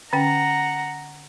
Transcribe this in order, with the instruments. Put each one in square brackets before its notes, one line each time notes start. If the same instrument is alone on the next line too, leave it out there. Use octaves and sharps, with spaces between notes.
[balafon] D3 C#4 G5 [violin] F#5 A#5